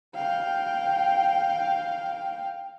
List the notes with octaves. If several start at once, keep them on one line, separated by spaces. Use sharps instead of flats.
F5 G5